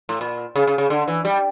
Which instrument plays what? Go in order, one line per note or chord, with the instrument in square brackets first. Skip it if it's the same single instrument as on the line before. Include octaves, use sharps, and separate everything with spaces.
[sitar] A2
A#2
C#3
C#3
C#3
D3
E3
G3